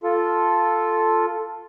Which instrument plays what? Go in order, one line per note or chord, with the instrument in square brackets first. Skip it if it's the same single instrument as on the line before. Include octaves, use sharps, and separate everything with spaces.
[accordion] F4 A4